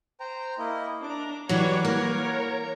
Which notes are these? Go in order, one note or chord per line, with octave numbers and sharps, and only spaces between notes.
C5 G5 A#5
A#3 E4 D#5
D4 A#5 D6
E3 F#3 G3 F#4 B4 C#5 F#5 D6
A#3 A#4 C#5
A#5